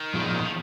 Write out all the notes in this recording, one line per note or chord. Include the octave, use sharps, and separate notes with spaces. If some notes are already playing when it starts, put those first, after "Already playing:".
Already playing: D#3
A#2 F3 B3 F4 G#4
F3